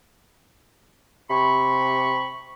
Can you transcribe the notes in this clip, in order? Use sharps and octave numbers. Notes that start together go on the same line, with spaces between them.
C3 B5 C#6